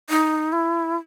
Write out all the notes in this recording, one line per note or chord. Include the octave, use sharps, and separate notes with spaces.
D#4
E4